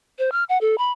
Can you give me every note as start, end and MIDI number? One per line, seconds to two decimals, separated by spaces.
0.19 0.30 72
0.32 0.44 89
0.49 0.58 78
0.61 0.76 69
0.78 0.92 83